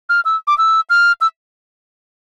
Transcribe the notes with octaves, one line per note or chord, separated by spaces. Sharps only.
F6
E6
D6
E6
F6
E6